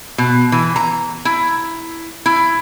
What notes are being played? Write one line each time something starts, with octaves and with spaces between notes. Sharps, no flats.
B2
E3
A#5
E4
E4